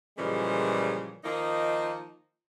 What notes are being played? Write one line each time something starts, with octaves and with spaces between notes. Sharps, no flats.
A#2 C#3 E3 F3 G3 G#3
D#3 F3 A#3 D#4